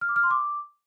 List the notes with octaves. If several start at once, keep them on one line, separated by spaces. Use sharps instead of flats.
F6
D6
F6
C6
D6